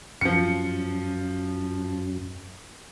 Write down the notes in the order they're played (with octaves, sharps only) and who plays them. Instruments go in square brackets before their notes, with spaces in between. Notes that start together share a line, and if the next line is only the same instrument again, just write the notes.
[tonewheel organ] F#2 [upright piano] F3 C#7